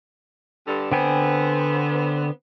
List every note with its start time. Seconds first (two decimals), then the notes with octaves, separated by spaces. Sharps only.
0.67 G2 D3
0.92 D3 B3 C4 G5 G#5